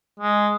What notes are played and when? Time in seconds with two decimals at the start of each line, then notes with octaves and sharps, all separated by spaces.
0.20 G#3